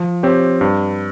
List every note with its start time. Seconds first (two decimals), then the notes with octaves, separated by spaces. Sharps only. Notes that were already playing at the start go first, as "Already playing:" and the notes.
Already playing: F3
0.23 C4 G4 C#5
0.61 G2